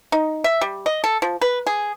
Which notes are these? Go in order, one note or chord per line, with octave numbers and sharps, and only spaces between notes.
D#4
E5
G3
D#5
A4
F3
B4
G#4